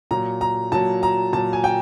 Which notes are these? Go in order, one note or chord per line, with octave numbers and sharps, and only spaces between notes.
A#2 F#3 A#5
A#5
A#2 F#3 A5
A#5
A#2 F#3 A5
G#5
G5